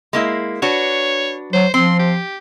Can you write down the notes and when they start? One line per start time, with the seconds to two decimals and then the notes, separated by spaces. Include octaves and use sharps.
0.13 G#3 A#3 E4
0.62 D4 F#4 B4 C#5
1.53 F#3 C5
1.74 F3 C4 C6
1.99 G4